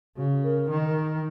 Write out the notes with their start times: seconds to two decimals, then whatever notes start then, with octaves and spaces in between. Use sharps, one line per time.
0.16 C#3 F#4
0.44 A#4
0.70 D#3